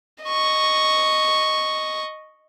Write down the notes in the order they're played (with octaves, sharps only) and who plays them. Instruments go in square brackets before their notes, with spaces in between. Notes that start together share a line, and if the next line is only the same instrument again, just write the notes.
[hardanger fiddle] D#5 C#6